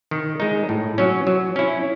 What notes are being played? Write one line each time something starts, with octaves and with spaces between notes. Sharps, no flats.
D#3
G#3 D#4
A2
F#3 C#4
F#3
C#4 E4